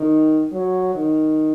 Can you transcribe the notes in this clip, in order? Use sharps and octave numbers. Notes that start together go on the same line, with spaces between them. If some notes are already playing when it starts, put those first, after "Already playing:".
Already playing: D#3
F#3
D#3